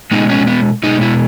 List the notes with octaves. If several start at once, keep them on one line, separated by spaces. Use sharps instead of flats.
B2 G#3 B3 D#4
C#4
B3
B2 G#3 B3 D#4
E4